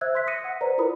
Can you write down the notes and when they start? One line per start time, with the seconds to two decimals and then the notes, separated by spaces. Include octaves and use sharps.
0.01 C5 E5 E6 F#6 G#6
0.14 E5 C6 F#6 B6
0.27 D#6 A#6 C#7 D#7
0.44 F#5
0.61 B4 C5 D5 A#5
0.78 E4 F4 A#4 B4 B5 D#6